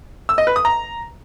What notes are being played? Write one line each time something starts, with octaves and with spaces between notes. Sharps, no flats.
E6
D#5
B4
D#6
A#5